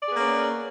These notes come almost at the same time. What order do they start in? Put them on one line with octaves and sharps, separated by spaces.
D5 G#4 B3 A#3 C#4